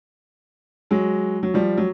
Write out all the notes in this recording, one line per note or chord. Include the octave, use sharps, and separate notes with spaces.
F#3 G#3
F#3
F3 G3
F#3